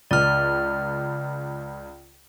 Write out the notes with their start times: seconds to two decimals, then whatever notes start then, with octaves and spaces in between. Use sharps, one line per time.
0.11 C#2 D5 F6